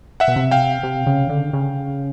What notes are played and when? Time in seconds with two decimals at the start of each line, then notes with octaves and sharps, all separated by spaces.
0.20 E5 F#5
0.28 B2
0.36 C3
0.51 F5 G5
0.83 C3
1.06 C#3
1.29 D3
1.53 C#3